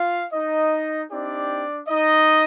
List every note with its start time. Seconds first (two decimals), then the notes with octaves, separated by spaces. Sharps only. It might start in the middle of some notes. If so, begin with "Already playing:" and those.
Already playing: F4 F5
0.33 D#4 D#5
1.10 C4 D4 D#4 G4 D5
1.88 D#4 D#5